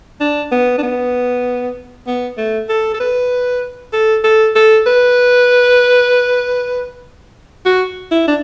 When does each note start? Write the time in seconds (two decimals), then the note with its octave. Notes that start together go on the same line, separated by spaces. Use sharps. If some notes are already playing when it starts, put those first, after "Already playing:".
0.21 D4
0.52 B3
0.78 D4
0.82 B3
2.07 B3
2.38 A3
2.69 A4
2.94 A4
3.00 B4
3.93 A4
4.24 A4
4.55 A4
4.86 B4
7.65 F#4
8.11 E4
8.28 D4